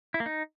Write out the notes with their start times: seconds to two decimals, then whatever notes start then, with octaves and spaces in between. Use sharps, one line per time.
0.14 E4
0.20 A#3
0.26 D#4